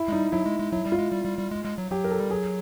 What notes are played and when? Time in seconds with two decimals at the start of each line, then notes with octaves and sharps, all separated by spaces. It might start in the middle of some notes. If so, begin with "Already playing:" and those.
Already playing: E4
0.08 G#3
0.12 G3 D#4
0.32 F#3 E4
0.46 G#3
0.59 G#3
0.72 F#3 E4
0.86 G3
0.92 F4
0.98 G#3
1.12 G3
1.25 G3
1.38 G3
1.51 G#3
1.65 G#3
1.78 F#3
1.91 F#3 G4
2.04 A#4
2.11 A4
2.20 G3
2.31 F#3 G#4